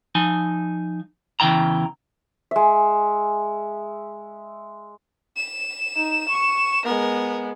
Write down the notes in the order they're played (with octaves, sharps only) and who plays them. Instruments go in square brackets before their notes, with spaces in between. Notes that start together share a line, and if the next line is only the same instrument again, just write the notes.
[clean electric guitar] F3 D#4 G#5
E2 C#3 E3 G5 A#5
[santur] G#3 E5
[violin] E7
[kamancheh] D#4
C#6
[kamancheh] G#3 B3 [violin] A#4